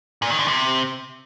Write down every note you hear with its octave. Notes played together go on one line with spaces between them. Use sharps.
A#2
D#3
D3
C3